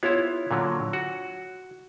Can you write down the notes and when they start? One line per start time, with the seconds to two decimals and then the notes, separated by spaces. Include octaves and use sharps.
0.03 B3 E4 F4 C#5
0.51 A#2 D3 F#3
0.93 F#4